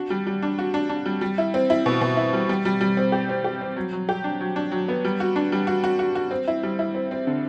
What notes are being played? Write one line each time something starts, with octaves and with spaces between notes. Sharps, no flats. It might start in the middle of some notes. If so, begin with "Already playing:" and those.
Already playing: D4 F#4
G3
G3
D4
F#4
D4
D4
G3
G3
E4
C4
E4
B2
B2
E4
G3
G3
G3
G3
C4
G4
C4
G4
C4
F#3
F#3
G4
D4
F#3
D4
F#3
B3
G3
F#4
D4
G3
F#4
F#4
F#4
F#4
C4
E4
G3
E4
C4
C4
D3